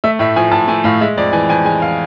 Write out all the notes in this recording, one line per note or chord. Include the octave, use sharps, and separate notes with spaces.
A3 E5
A2 E5
F3 G#5
A2 A5
A3 G#5
A2 F5
G#3 E5
F2 D5
E3 G#5
F2 G#5
G#3 G#5
F5